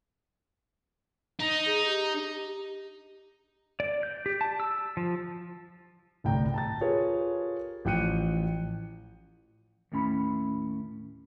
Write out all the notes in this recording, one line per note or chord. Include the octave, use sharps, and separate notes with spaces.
D#4
G#4
G4
D5
G6
G4
A5
E6
F3
G1 C2 A2 G5 A#5
A5 A#5 A6
F4 G4 G#4 A#4 B4 C#5
A1 F3 G5 F#6 C#7 D#7
D#2 A2 C#4 B5